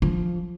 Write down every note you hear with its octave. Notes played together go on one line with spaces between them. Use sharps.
F3